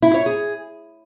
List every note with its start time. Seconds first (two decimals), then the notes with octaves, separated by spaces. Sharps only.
0.02 E4
0.14 C#5
0.26 G#4